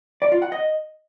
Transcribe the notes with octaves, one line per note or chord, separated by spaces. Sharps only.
D5
F4
F#5
D#5